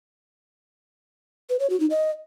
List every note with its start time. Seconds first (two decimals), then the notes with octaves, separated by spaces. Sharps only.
1.49 B4
1.60 C#5
1.70 F#4
1.80 D#4
1.90 D#5